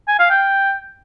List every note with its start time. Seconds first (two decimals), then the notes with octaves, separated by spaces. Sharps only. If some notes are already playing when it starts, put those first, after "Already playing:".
0.08 G#5
0.19 F5
0.30 G5